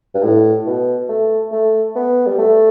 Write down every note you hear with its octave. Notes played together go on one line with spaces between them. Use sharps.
G2
A2
B2
A3
A3
B3
G3
A3